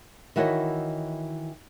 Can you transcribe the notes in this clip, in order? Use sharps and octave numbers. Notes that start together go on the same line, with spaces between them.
D#3 E3 E4 F#4 C#5 D#5